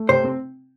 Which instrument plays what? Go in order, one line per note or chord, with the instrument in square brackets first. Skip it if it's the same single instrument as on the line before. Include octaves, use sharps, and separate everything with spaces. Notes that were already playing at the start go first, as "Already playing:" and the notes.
Already playing: [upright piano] A3
[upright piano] C3 [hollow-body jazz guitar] C5
[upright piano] C4